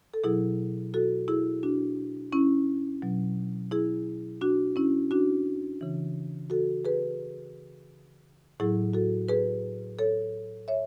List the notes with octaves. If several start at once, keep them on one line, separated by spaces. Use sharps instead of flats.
A4
B2 F#3 E4 G#4
F#4 A4
E4 G#4
D4 F#4
C#4 E4
B2 F#3
E4 G#4
D4 F#4
C#4 E4
D4 F#4
C#3 E3
F#4 A4
G#4 B4
A2 F#3 E4 G#4
F#4 A4
G#4 B4
A4 C#5
C#5 E5